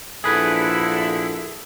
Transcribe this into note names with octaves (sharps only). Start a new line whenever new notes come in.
A#1 D3 E4 G#4 B4